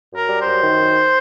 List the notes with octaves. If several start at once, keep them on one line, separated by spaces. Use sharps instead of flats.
F#2 A#4
G3
C5
F#2
D#3
F#2